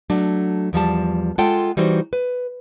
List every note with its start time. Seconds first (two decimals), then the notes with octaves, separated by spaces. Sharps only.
0.10 F#3 A3 D4
0.73 E2 F3 G3 A5
1.38 G#3 F4 A4 F#5 G5 A5
1.77 E3 G3 D#4 F#4 C5
2.13 B4